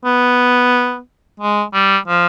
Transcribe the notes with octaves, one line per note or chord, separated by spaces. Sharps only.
B3
G#3
G3
F3